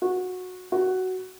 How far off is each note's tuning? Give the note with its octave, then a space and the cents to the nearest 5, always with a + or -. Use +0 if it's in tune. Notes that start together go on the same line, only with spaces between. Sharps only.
F#4 -15
F#4 +10